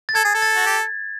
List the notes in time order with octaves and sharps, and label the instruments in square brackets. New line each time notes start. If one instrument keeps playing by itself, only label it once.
[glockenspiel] A6
[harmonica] A4 [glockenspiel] G#6
[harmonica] G#4
A4
[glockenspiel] A6
[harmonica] F#4
G4